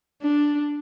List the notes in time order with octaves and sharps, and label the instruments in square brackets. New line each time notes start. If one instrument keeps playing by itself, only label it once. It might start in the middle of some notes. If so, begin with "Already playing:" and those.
[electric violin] D4